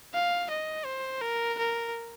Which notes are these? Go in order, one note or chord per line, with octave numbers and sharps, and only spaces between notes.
F5
D#5
C5
A#4
A#4